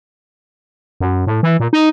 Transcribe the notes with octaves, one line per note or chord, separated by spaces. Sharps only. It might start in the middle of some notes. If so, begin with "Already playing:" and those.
F#2
A2
E3
A#2
D#4